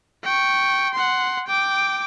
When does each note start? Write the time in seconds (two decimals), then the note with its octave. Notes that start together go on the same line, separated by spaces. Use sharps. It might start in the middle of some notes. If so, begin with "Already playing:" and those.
0.24 G5 C#6
0.94 F#5 C6
1.48 G5 D6